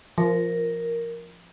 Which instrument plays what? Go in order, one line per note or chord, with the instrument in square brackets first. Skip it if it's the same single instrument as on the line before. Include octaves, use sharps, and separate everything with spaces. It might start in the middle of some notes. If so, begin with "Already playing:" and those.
[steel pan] F3 [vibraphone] A#4